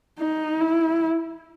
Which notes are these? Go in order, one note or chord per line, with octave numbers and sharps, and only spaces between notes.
D#4
E4